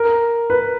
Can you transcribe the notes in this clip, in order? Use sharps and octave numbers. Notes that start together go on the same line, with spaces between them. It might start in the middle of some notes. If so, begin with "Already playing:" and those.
Already playing: A#4
B4